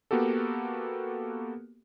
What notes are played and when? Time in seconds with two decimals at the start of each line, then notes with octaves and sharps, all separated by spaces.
0.11 A#3 B3 F#4 G4 A4